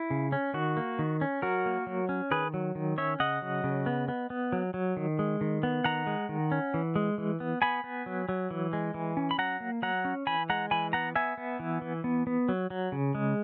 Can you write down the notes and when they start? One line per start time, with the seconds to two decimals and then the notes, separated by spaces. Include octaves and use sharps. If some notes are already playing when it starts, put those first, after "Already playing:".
Already playing: E4
0.11 C#3
0.32 C#4
0.54 D#3 F#4
0.77 A#3
0.99 D#3
1.21 C#4
1.42 F#3 F#4 A#4
1.66 A#3
1.87 F#3
2.09 C#4
2.31 D#3 G#4 B4
2.54 F#3
2.75 D#3
2.98 C#4 C#5 E5
3.20 C#3 D#5 F#5
3.42 F#3
3.64 C#3
3.86 B3
4.08 B3
4.30 B3
4.53 F#3
4.74 F#3
4.97 D#3
5.19 G#3
5.41 D#3
5.63 B3
5.84 D#3 F#5 A#5
6.07 G#3
6.29 D#3
6.52 C#4
6.74 E3
6.96 G#3
7.18 E3
7.40 B3
7.62 B3 G#5 B5
7.84 B3
8.06 F#3
8.29 F#3
8.51 E3
8.73 G#3
8.94 E3
9.17 C#4
9.31 B5
9.38 F#3 F#5 A#5
9.60 A#3
9.82 F#3 F#5 A#5
10.05 C#4
10.27 E3 G#5 B5
10.50 G#3 F#5 A#5
10.71 E3 G#5 B5
10.93 B3 F#5 A#5
11.16 B3 E5 G#5
11.38 B3
11.60 E3
11.82 E3
12.04 B3
12.27 B3
12.49 F#3
12.70 F#3
12.92 C#3
13.15 G#3